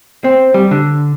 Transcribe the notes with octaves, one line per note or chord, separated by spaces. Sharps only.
C4
G3
D3